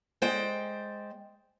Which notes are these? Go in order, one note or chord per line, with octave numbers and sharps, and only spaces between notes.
G#3 C5 D5 G5